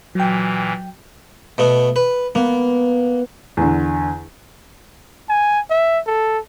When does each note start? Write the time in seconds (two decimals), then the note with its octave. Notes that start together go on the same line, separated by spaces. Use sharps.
0.15 A#2 E3 F#3 G5
1.58 B2 A3 B3
1.96 B4
2.35 A#3 B3
3.57 E2 D3
5.29 G#5
5.70 E5
6.07 A4